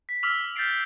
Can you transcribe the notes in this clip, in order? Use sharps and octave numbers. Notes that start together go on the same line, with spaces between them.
B6
D6 E6 F6 B6 F7
F6 G6 A6 B6 C7 D7